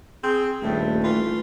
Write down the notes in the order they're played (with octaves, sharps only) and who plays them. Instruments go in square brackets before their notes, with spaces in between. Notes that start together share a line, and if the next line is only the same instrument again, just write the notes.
[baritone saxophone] C4 [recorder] G#4
[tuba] D#1 [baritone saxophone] G2 [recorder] A3
[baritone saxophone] E3 [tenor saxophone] F4